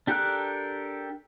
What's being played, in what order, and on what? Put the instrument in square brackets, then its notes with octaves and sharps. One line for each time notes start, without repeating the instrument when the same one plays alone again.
[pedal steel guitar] D4 G4 A4 A#4 F#6